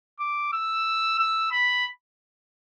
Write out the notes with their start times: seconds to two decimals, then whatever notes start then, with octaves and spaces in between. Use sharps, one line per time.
0.20 D6
0.53 E6
1.18 E6
1.51 B5